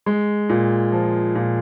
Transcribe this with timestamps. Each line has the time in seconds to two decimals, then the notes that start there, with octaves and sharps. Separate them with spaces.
0.06 G#3
0.49 A#2
0.92 F3
1.35 A#2